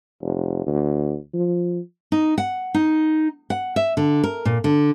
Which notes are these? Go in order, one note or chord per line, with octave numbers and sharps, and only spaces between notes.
F1
D2
F3
D#4
F#5
D#4
F#5
E5
D3
A#4
A#2
D3